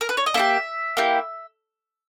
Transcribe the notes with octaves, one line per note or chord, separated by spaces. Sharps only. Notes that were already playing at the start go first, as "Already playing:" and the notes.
A#4
B4
C#5
D#5
A#3 E4 G4 E5
A#3 E4 G4